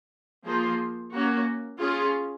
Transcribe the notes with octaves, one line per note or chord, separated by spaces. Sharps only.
F3 A#3 F4 G#4 C5
A#3 C#4 F#4
C#4 F4 G#4